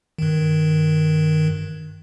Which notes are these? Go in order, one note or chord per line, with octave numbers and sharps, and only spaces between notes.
G2 D#3